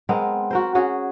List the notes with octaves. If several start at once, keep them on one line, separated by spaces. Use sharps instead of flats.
G#3 B3 C4 A#4
F#4 A#4 C5
C#4 F#4 G#4